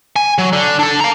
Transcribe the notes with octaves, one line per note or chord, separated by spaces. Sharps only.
G#5
F#3
D3
D4 A4
F5 A#5